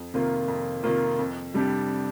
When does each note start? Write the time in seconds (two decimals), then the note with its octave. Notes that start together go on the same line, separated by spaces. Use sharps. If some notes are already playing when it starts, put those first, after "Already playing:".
Already playing: F2
0.14 C3 D#3 A#3 F4
0.48 F2
0.84 C3 D#3 A#3 F4
1.19 F2
1.54 C3 G3 D4 G4